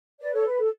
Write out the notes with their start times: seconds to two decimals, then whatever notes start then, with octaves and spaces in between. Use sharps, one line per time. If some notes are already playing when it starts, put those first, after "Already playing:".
0.20 B4 D5
0.33 A4 C#5
0.46 B4
0.58 A4